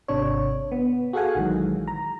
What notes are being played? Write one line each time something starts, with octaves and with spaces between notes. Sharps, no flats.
G#1 C3 D4 C#5
B3
F#4 G#4 A4 F5 F#5 G#5
A#1 D#3 E3 F#3 G#3
A#5